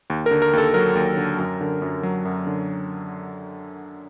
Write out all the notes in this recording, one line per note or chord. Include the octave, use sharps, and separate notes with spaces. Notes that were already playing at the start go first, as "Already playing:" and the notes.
D#2
D3 A#4
A#4
D#2 A4
F#3 A#4
D#2
D3
F#2
D3
F#2
F#3
F#2
D3